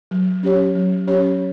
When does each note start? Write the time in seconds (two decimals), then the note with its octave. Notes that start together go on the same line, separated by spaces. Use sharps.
0.11 F#3
0.43 C#4 G4 C#5
0.75 F#3
1.07 C#4 G4 C#5